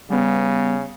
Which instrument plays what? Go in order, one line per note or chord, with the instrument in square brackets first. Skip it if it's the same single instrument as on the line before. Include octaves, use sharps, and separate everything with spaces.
[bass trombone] C#3 [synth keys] G3 B3